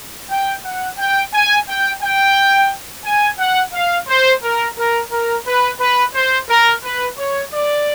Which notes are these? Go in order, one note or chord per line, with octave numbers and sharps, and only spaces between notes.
G5
F#5
G5
G#5
G5
G5
G#5
F#5
F5
C5
A#4
A#4
A#4
B4
B4
C5
A#4
B4
C#5
D5